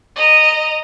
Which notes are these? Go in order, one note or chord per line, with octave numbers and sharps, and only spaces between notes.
D#5 A#5